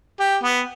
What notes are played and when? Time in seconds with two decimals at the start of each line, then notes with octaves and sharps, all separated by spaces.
0.20 G4
0.43 B3